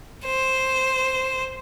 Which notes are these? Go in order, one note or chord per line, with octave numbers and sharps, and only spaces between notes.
C5